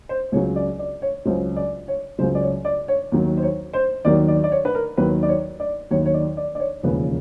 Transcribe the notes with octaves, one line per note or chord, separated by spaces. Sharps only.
C5
C#2 C#3 F#3 C#5
D5
D5
C#5
C#2 C#3 F#3 C5
D5
C#5
C#2 C#3 F#3 C5
D5
C#5
D5
C#5
D#2 D#3 F#3
C5
C#5
C5
D#2 D#3 F#3 D5
D5
D5
C#5
B4
A#4
D#2 D#3 F#3 B4
D5
C#5
D5
D#2 D#3 F#3 C#5
C#5
D5
D5
D5
C#5
E1 D#2 C#3 F3 B4